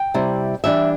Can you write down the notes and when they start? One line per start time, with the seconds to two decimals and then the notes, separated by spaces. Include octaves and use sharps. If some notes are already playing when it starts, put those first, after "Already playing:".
Already playing: G5
0.14 C3 G3 E4
0.64 E3 G3 D4 E5